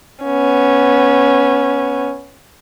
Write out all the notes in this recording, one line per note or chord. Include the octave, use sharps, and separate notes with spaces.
B3 C#4